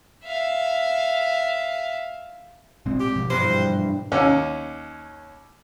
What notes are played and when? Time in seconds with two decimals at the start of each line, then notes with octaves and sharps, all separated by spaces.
0.24 E5 F5
2.86 A#2 G#3 C4
3.00 G4
3.16 G#2 B2 F3
3.30 E2 G2 C5
4.12 D#2 C#4